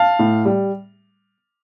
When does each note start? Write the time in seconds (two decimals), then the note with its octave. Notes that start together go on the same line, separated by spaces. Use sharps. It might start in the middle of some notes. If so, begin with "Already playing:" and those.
Already playing: F5 A5
0.19 A2
0.45 G3